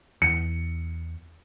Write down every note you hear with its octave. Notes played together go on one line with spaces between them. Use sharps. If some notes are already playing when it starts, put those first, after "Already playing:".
E2 C#7